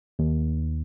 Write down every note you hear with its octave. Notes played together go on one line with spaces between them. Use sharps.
D#2